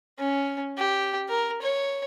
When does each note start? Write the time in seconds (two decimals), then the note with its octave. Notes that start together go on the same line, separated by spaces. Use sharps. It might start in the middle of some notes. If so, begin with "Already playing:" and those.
0.19 C#4
0.78 G4
1.29 A#4
1.62 C#5